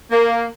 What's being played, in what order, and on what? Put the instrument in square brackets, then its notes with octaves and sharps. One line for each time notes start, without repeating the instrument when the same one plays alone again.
[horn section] A#3